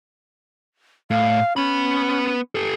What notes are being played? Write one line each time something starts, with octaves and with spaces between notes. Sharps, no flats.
A2 F5
B3 C#4 B5
G4 A4